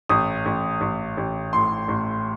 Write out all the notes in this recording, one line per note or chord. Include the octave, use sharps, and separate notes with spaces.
A1 D#6
A1
A1
A1
A2 C6
A1